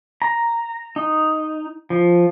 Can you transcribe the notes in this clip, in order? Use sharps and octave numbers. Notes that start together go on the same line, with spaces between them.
A#5
D#4
F3